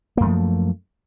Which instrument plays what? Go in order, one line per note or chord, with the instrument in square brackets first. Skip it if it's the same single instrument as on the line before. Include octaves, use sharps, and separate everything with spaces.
[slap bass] A#3
F#2
A3
F3